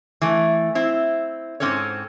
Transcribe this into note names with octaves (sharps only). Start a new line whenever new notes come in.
E3 A3
C4 E4
G#2 C#3 C4 C#4 A4 C#5